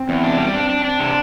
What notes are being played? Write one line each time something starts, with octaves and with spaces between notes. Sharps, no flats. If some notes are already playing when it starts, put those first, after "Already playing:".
Already playing: C4
E2
D4
G3
C4 D4
D4
D4
C3